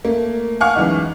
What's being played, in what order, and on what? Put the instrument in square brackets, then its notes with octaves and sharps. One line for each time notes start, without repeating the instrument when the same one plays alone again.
[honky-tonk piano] A3 A#3
F5 F#5 G#5 C#6 D6 F6
C#2 F#2 E3 D#4